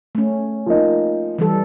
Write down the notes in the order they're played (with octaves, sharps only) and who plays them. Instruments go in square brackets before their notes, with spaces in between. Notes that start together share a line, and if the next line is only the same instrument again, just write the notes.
[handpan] A3 C#4
[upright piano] F3 A#3 D#4
[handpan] E3 G3 A4